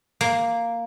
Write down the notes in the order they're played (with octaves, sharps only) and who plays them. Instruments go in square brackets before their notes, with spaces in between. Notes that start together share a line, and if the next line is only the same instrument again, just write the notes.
[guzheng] A#3